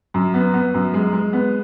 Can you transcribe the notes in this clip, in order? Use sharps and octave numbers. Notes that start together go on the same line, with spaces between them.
F#2
B3
B3
F#2
G#3
G#3
B3